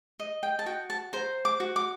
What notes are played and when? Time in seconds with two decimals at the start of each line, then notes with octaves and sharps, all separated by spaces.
0.20 D#5
0.43 G5
0.59 A5
0.66 F#4 G5
0.90 A5
1.13 C5 A#5
1.45 D6
1.60 F#4
1.76 D6